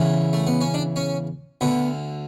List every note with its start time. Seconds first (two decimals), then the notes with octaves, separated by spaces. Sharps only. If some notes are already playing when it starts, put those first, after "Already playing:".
Already playing: E2 C#3 E3
0.33 A3
0.47 B3
0.61 C#4
0.74 D4
0.96 C#4
1.61 D2 D3 B3